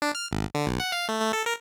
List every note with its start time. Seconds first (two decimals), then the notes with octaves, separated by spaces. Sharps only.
0.02 D4
0.15 F6
0.31 G#1
0.55 D3
0.67 B1
0.80 F#5
0.92 F5
1.09 A3
1.21 A3
1.33 A4
1.46 A#4